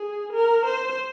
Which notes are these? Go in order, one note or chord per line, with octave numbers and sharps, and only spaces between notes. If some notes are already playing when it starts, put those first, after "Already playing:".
Already playing: G#4
A#4
C5